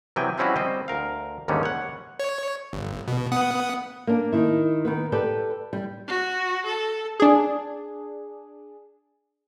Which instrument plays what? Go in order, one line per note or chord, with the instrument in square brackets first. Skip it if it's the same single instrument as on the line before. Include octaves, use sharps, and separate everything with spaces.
[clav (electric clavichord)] C3 E3 F#3 B3 G5 G#5
F3 G3 C4 C#4 E4 F#4
G3 C4 C5 D#5
D2 A#4 F5
D#2 G#2 D3 D#3 G3 C#4
C#5 F#5
[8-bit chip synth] C#5
G1
B2
B3 F#5 D#6
[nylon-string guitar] A#3 D4
D#3 E4
D#3 B3 B4
G4 A4 B4 D5
G3
[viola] F#4
A4
[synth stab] D4 G#4